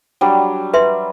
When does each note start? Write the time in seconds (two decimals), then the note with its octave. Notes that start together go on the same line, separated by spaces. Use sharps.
0.21 F#3 G3 D4
0.74 B4 E5 C6